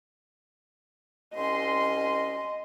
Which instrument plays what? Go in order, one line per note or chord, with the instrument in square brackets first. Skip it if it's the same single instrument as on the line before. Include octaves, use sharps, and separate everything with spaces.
[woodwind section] C2 C#4 C6 [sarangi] D#5